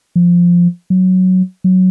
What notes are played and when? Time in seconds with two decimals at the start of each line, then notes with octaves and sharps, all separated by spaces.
0.16 F3
0.90 F#3
1.64 F#3